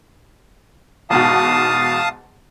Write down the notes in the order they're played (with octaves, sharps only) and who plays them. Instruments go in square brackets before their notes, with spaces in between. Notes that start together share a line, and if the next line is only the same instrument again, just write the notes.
[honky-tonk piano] E2 G#2 B2 [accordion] F5 A5 D#6